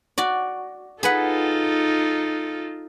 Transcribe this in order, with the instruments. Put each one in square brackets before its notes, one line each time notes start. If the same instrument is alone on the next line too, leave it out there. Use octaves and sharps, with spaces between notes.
[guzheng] F#4 D5
[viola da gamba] D#4 F4 A4 [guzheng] G#4 B4 F#5